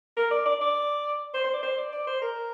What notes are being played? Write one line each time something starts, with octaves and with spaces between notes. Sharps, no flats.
A#4
D5
D5
D5
C5
C5
D5
C5
D5
D5
C5
A#4